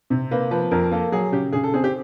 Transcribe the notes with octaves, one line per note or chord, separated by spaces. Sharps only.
C3
A#3 B4
F3 B4
F2 A#4
A#3 A4
F#3 G#4
C#3 G4
C#3 G#4
A4
C4 G#4
G4